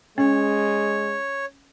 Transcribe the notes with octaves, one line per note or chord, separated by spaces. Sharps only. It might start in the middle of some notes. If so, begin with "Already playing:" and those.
G#3 C#4 C#5